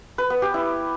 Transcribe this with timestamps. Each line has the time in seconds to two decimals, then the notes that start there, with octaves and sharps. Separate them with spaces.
0.18 B4
0.30 B3
0.42 G4
0.54 E4